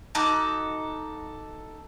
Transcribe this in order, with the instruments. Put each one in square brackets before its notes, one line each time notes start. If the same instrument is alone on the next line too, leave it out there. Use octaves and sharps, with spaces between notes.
[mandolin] D#4 F#4 A4 [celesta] A5 A#5 D6